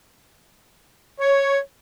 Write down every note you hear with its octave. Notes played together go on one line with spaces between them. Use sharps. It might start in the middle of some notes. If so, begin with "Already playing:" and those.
C#5